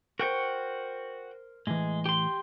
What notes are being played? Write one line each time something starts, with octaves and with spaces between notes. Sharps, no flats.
F#4 A#4 C5 G5 C#6
A2 E3 G#3
G4 C6